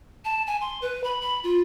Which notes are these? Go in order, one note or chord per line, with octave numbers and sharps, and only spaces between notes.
A5
G#5
C6
B4
B5
B5
F4